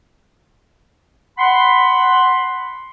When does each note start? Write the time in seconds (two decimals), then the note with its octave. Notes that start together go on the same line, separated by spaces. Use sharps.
1.38 F#5 B5 C6